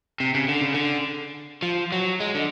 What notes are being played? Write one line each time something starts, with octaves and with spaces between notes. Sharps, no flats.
C3
C#3
D3
C#3
D3
F3
F#3
G#3
D3